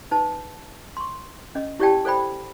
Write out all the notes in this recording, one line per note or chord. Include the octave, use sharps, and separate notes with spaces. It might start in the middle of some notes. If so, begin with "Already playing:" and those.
D#4 B4 A5
C6 C#6
C#4 D#5
E4 G4 C#5 D5 G5 A5
A4 C5 D5 G5 B5